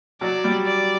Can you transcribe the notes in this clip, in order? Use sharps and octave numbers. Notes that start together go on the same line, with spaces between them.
F#3 D5
G3
D5